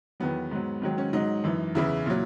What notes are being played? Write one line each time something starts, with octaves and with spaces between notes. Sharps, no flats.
E2 D#3 F#3 B3
G#2 F#3
G#2 D#3 F#3
C#4
G#2 F#3 D#4
F#2 E3
E2 C#3 E3 E4
A#2 F#3